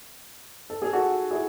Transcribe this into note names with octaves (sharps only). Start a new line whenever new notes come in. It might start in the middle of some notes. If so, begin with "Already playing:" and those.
A4
G#4
F#4 A4
E4 G#4